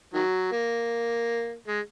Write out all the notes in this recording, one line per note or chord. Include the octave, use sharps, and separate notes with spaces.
D#3 F#3
A#3
G#3